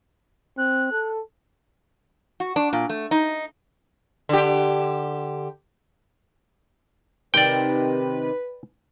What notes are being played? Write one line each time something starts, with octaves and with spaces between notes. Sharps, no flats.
C4 F#6
A4
F#4
D4
A#2
A3
D#4
D3 G4
C3 D#3 B4 D5 G5